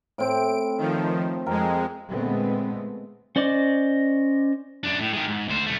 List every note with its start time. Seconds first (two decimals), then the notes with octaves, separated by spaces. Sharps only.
0.18 A2 C4 D7
0.78 D#3 F3
1.46 F2 G#3 A#4 G5
2.09 A#2 D3 G#3 A3 B3 C4
3.36 C#4 C5 D5 D#5 D6
4.83 F#2 D4
5.00 A2
5.13 D#3 G#3
5.28 G#2
5.48 D2 C5
5.66 C2 A3